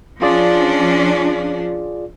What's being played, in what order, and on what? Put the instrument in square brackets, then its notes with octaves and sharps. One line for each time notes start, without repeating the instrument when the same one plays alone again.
[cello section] F3 C#4 D4 [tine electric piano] F4 G#4 D5